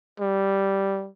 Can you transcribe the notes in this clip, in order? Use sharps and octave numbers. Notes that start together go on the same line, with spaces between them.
G3